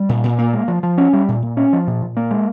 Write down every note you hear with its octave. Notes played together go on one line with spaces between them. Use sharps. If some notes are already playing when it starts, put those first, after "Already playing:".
Already playing: G3
A#2
A#2
A#3
G#3
F3
F3
C#4
G3
A#2
A#2
C#4
F3
A#2
A#2
A#3
G#3